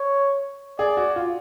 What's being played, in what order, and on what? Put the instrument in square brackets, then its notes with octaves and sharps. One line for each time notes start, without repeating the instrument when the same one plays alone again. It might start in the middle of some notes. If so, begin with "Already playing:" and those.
Already playing: [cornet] C#5
[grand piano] G#4 [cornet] D5
[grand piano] F#4
F4